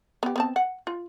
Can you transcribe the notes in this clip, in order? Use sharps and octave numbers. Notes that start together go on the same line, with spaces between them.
B3 G4
B3 C4 A5
F#5
F4